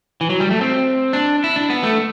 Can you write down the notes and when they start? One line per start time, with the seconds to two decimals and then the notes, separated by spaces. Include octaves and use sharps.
0.21 E3
0.30 F#3
0.40 G3
0.50 A3
0.61 C4
1.13 D4
1.44 E4
1.56 D4
1.70 B3
1.83 A3